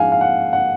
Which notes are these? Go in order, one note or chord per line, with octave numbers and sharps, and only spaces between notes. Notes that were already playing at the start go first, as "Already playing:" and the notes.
Already playing: G#2 F3 G#3 F5 F#5 G#5
F5
F#5
F#5